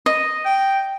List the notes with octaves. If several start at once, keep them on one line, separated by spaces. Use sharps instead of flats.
D#5
G5